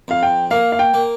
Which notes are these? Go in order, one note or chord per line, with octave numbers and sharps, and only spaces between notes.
F2 F5
G5
A#3 F5
F5
G5
A#3